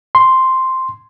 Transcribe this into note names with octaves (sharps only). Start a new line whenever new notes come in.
C6